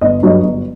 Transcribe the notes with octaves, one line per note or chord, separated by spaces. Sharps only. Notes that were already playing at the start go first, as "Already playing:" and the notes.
G1 D#5
G2 F#3 D#5
G1